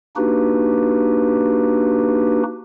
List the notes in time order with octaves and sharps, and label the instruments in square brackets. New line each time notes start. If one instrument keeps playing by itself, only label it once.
[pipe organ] A#3 D4 D#4 F#4 G4 B4